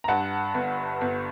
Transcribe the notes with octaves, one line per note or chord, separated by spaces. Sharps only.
A#5
G2 F#5 A5
G1
G1